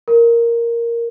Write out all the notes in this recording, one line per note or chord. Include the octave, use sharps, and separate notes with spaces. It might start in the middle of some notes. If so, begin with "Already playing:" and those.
A#4